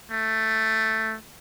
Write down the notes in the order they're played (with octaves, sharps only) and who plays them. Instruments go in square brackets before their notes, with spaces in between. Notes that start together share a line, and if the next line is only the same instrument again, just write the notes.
[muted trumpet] A3